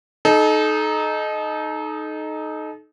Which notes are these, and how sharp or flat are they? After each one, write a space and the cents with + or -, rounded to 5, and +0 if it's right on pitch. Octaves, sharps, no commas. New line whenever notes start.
D#4 -5 A4 -35